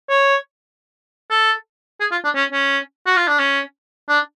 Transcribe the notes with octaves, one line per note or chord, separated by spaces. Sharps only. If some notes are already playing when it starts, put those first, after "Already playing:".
C#5
A4
G#4
F4
D4
C#4
C#4
F#4
F4
D4
C#4
D4